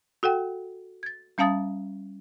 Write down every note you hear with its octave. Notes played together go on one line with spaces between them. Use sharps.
F#4 A4 F#5 G5
G#6 A6
G3 C#4 F5 A5 D#6 A6